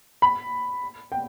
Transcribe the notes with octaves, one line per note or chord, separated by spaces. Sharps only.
B5
G5